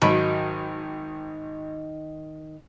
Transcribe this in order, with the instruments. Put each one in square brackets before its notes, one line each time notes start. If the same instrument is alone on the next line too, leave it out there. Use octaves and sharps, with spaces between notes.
[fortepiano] G#1 F#3 B5 [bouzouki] D#3